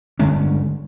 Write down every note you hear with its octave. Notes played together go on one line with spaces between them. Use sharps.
G1 D3 G#3 C#4